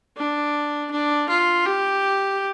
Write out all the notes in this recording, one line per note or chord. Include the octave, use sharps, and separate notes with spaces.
D4
D4
F4
G4